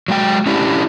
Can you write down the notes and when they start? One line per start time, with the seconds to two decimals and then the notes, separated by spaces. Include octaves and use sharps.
0.08 F#3 G#3 G5
0.46 C#4 D4 E4 G4